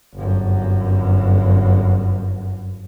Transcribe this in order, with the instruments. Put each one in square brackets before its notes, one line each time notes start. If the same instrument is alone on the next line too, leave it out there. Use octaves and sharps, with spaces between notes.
[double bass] G1 F#2